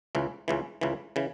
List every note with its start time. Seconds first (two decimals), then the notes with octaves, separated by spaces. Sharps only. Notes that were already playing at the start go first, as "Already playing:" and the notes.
0.15 C#2 C#3 E3
0.48 C#2 C#3 E3
0.81 C#2 C#3 E3
1.16 C#3 E3